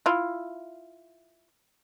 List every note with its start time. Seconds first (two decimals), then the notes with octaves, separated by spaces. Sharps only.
0.06 E4 F4